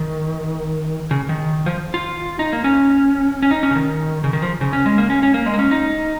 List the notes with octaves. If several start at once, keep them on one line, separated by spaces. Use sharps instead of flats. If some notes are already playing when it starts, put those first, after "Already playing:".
Already playing: D#3
C#3
D#3
F3
F4
D#4
A#3
C#4
C#4
D#4
C#4
C#3
D#3
C#3
D#3
F3
C#3
C#4
G#3
A#3
C#4
C#4
A#3
G#3
A#3
C#4
D#4